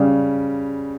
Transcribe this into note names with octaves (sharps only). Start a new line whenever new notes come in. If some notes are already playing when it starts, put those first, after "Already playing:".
Already playing: C#3 G3